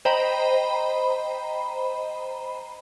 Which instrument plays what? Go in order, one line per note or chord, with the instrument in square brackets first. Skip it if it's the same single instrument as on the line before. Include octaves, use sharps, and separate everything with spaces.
[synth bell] C5 D#5 G5 A#5 B5